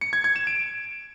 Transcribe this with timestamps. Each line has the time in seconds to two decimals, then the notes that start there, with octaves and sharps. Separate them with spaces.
0.01 C#7
0.13 G#6
0.24 G#6
0.36 E7
0.47 D7